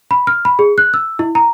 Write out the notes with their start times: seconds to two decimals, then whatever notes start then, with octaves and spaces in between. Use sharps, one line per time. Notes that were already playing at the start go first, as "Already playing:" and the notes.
0.11 B5
0.27 F6
0.45 B5
0.59 G#4
0.78 F#6
0.94 E6
1.19 E4
1.35 A#5